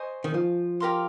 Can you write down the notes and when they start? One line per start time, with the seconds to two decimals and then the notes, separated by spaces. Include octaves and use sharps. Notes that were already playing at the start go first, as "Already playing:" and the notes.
Already playing: C5 D#5 G#5 C#6
0.24 D#3
0.34 F3
0.80 G4 A#4 F5 C6